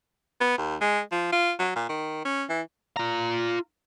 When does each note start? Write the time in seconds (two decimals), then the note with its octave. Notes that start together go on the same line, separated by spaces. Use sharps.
0.41 B3
0.58 D#2
0.81 G#3
1.12 F3
1.32 F4
1.59 F#3
1.76 A#2
1.89 D#3
2.25 C#4
2.49 E3
2.97 F4 A#5